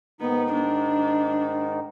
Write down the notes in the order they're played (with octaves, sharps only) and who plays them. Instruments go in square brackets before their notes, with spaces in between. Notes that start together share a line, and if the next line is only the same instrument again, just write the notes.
[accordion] G#2 D#3 D#4 [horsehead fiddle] B3
[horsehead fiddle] D4